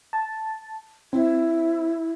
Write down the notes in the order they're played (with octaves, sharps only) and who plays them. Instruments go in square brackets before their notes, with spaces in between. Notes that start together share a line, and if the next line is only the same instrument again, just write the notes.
[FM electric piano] A5
[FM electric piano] C4 [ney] E4